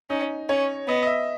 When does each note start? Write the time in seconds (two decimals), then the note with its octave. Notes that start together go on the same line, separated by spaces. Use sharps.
0.10 C#4 D#4
0.49 C#4 C#5
0.88 B3 D#5
1.02 D#5
1.07 E5